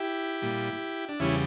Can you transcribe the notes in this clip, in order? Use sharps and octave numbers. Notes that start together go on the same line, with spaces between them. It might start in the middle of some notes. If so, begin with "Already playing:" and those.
Already playing: E4 G4
A#2 G3
D4
E2 C#3 G3 C#4 E4